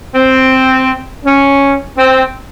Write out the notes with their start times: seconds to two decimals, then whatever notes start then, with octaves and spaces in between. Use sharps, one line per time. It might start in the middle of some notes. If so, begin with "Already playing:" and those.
0.15 C4
1.24 C#4
1.96 C4